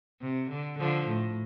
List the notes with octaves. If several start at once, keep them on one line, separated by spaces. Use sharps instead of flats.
C3
D3
D3 F3
A2